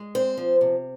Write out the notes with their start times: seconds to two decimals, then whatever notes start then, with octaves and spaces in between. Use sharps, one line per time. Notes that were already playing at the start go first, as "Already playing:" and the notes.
Already playing: G#3
0.15 C4 C5
0.37 F3
0.61 C3